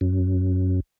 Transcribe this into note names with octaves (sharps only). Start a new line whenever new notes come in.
F#2